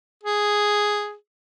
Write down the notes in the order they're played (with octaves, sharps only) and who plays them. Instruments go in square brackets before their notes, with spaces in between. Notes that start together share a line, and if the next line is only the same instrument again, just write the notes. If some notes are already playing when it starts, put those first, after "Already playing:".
[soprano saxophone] G#4